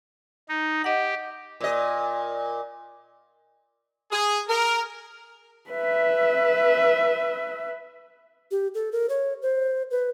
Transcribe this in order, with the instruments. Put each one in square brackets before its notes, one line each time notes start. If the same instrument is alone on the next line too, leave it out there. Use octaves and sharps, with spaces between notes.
[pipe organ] D#4
[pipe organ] G4 [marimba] D#5 F#5
[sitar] A#2 D#5
[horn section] G#4
A#4
[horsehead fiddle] B4 E5
[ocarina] G4
A4
A#4
C#5
C5
B4